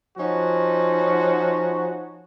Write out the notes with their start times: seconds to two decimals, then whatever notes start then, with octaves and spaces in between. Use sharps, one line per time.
0.18 F3 C#4 D#4 F#4